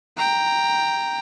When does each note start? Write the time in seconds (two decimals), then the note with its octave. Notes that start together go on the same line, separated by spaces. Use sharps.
0.17 G5 A#5